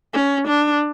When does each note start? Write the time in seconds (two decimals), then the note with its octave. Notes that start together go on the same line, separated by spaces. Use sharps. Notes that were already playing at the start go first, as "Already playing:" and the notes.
0.13 C#4
0.47 D4